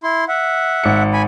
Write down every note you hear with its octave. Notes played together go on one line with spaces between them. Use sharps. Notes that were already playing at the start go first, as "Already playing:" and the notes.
E4 C6
E5 F#5
G#1 C#7
G#5 B5